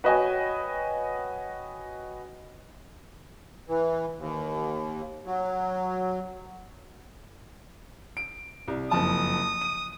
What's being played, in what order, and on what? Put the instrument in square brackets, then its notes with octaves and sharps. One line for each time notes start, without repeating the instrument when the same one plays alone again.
[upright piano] F#4 B4 C#5 D#5 G5 G#5
[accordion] E3
D#2
F#3
[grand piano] D7
C2
[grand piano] F#1 F2 A5 [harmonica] D#6
[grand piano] D#7